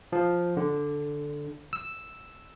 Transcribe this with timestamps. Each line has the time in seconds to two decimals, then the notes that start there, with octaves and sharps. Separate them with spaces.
0.12 F3
0.57 D3
1.73 E6